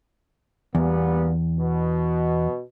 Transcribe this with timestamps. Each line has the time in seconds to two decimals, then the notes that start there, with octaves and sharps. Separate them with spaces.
0.75 E2 A#2 G3 B3
1.59 B2